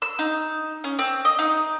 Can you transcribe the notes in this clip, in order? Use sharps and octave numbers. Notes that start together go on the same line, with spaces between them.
E6
D#4
C#4
C4
D#5
D#4